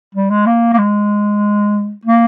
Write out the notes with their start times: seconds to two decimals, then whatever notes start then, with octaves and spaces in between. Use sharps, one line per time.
0.15 G3
0.30 G#3
0.46 A#3
0.73 A#3
0.78 G#3
2.05 A#3